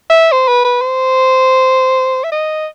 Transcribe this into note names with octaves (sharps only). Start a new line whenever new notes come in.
E5
C5
B4
B4
C5
E5
D#5